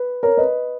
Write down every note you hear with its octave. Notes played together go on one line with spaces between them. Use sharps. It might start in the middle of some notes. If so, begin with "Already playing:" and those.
Already playing: B4
A#4 C#5
B4 D#5